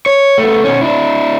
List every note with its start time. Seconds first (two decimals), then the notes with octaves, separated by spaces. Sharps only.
0.06 C#5
0.38 A3 B3
0.64 B2 C#4
0.81 D4 E4